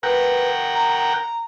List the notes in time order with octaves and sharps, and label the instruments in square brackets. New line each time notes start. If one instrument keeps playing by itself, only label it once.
[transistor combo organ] A#4 F#5 G5 [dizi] B4
[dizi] A#5
A#5